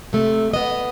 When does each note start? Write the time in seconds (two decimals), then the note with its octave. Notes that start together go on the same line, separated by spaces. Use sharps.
0.13 C3 A3
0.54 B3 D#5